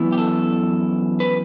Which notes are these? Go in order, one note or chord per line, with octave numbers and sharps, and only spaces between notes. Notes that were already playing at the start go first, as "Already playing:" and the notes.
Already playing: F#2 E3 B3 E4
G4
A4
B4